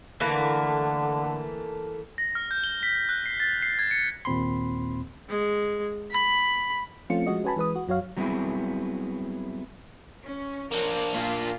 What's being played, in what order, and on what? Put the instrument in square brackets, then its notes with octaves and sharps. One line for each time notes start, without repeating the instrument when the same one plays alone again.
[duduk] D3 [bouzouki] E3 A3 A#3
[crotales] A#6
F6
G6
G7
B6
F#6
C7
A6
C7
G#6
C#7
[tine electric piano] D#2 A#2 C4 B5 C6
[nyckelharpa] G#3
B5
[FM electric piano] F3 A3 C4 C#4 F4 C#7
F3 G#3 F#4 D#5
C#4 F#4 B4 G#5 A5 B5
E3 G#3 B4 D#6
F#4
F#2 F#3 F#4 C#5 F5
[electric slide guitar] F#3 G3 B3 C4 E4 G#4
[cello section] C#4
[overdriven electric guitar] A#3 D4 [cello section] A#4 C5 C#5
[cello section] A#2 F4